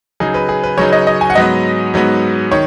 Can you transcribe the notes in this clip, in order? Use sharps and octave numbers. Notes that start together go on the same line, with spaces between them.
C#3 F#3 D#4 G#4
B4
G#4
B4
C#3 F#3 D#4 C#5
D#5
D#5
G#5
F#5
G#2 F#3 B3 D#5
G#2 F#3 B3
D#3 C#5